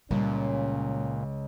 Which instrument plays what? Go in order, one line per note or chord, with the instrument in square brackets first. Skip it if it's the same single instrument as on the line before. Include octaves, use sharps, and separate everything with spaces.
[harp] C#2 [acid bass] A#2 [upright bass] G3 [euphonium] C#4